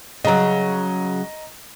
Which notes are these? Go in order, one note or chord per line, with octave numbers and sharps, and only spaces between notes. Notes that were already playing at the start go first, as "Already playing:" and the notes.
C#3 F#3 D#5 A#5